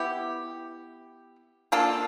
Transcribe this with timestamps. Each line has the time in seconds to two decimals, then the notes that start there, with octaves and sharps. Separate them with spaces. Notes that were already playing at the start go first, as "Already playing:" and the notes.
Already playing: B3 E4 G4
1.72 A#3 D4 F4 A4